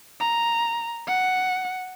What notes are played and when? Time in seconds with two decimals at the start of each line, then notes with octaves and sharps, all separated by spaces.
0.20 A#5
1.08 F#5